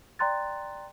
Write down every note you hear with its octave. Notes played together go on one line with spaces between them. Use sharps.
D5 G5 A#5 C6 F#6 A6